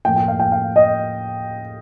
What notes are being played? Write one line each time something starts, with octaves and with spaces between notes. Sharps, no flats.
A2 F3 A#3 G5
G5
F5
G5
F5
D#5